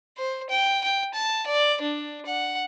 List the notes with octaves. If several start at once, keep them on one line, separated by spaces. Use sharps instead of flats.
C5
G5
G5
A5
D5
D4
F#5